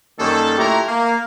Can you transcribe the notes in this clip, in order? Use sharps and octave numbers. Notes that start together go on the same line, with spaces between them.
F#2 D#3 G3 A#3 A4
A#2 A3 E4 G4 A#4 A#5
A#3